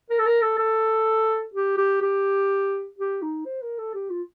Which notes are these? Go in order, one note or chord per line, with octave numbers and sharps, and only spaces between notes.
A#4
A4
A#4
A4
A4
G4
G4
G4
G4
D#4
C5
A#4
A4
G4
F4